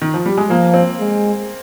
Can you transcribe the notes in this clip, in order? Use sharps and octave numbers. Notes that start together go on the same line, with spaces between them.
D#3
F3
G3
G#3
F3 A#3
C4
G#3